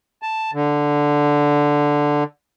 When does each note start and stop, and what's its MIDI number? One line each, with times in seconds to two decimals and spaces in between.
0.23 0.51 81
0.53 2.24 50